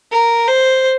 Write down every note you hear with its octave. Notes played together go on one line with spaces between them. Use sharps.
A#4
C5